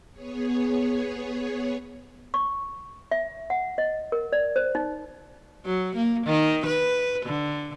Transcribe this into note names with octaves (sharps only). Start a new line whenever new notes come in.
B3 G#4 C#5
C#6
E5
F#5
D#5
A#4
D5
C5
D#4
F#3
A#3
D#3
B4
D3